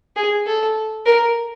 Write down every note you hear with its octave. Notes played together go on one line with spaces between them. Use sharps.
G#4
A4
A#4